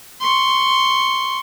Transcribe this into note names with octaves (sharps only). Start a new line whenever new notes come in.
C6 C#6